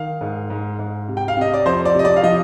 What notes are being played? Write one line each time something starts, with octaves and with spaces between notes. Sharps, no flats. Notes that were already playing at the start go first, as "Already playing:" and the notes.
Already playing: D#3 F5
G#2
G#2
G#2
C3
G5
F5
C3 D#5
D5
F2 C5
D5
C3 D#5
D5
F5
F3 D#5